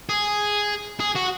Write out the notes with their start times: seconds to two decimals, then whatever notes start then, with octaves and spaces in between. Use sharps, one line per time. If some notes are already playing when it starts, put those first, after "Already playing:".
0.09 G#4
1.00 G#4
1.16 F#4